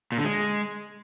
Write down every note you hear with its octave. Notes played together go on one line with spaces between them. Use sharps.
A#2
D3
G#3